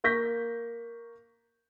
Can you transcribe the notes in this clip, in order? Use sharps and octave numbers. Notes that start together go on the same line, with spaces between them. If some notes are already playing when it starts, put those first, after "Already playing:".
A#3 C#6 G6 A#6 B6